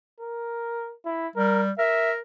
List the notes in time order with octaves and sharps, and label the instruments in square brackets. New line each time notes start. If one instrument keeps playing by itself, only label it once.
[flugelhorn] A#4
E4
[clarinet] G3 [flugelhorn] A#4
[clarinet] A#4 [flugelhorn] E5